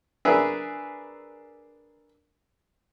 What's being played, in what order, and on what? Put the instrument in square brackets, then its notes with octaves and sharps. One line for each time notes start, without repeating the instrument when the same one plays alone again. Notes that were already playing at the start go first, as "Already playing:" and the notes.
[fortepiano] D4 G#4 A#4 B4 E5